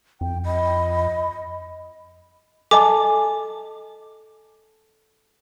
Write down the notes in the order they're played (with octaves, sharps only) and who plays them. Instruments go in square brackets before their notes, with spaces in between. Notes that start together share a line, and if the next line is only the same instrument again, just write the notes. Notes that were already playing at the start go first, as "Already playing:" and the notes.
[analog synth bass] F2 [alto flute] G5
[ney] D#5 [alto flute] B5
[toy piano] A4 D#5 A5 [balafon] G#5 [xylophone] D6